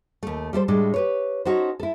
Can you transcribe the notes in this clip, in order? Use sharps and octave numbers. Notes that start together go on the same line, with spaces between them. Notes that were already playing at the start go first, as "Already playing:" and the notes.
D#2 A3
G3 E4 A4 C5
A2 G3 G#3 D4 A4
G4 B4 C#5
C#4 D#4 F#4 A4 C5
E4 A4